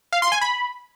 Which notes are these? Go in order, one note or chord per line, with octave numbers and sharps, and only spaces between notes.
F5
C6
G#5
B5